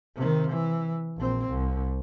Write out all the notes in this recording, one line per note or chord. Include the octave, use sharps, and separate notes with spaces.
C3 D#3
E3
A#1 C4
C2